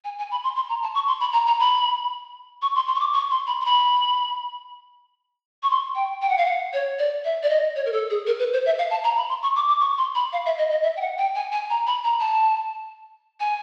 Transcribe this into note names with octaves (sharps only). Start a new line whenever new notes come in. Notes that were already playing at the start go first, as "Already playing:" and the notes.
G#5
G#5
B5
C6
C6
A#5
A5
C#6
C6
B5
A#5
A#5
B5
C#6
C6
C6
C#6
D6
C#6
C6
B5
C6
B5
C#6
C6
G5
G5
F#5
F5
F#5
C#5
D5
E5
D5
D#5
C#5
A#4
A4
G#4
A#4
B4
C5
E5
F5
A5
A#5
B5
C6
C#6
D6
D6
C#6
C6
B5
F5
E5
D#5
D#5
E5
G5
F#5
G5
G#5
G#5
A#5
B5
A#5
A5
G#5